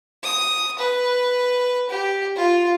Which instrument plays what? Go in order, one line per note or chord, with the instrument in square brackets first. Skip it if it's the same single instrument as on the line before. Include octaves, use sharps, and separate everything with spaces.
[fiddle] D#6
B4
G4
F4